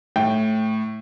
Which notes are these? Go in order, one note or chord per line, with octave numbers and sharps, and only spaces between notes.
A2 G5